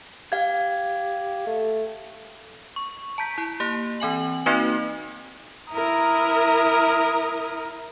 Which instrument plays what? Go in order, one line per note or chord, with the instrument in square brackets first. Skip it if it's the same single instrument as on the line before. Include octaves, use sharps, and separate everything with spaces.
[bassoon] G4 [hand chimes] F5 G#6
[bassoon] A3
[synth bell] C#6
A5 A#5 G6 B6
E4
A#3 G4
E3 C4 G#5 F#7
A#3 C4 D#4 F#4 B4
[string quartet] E4 A#4 A#5 D#6